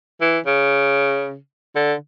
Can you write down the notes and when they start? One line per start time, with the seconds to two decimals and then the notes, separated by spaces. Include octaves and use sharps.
0.21 E3
0.46 C#3
1.76 D3